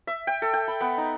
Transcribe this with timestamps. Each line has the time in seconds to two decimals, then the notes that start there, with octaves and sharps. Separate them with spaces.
0.07 E5
0.27 G5
0.42 A4
0.54 G5
0.68 B5
0.81 B3
0.98 D#4